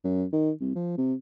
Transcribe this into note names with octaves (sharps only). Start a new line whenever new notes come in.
F#2
D#3
C2
F3
C3